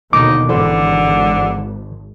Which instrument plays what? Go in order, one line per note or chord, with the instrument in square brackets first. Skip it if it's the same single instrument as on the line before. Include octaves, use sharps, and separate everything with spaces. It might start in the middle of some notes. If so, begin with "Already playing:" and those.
[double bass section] D#2 B2 D3 [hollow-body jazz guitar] D#3 [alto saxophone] D#4 [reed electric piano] D6
[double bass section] G#1 [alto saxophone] D3 [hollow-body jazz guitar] E3 A4 C5